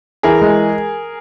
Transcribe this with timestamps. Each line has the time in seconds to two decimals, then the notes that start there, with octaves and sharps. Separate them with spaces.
0.23 E3 G#4 A#4
0.41 G#3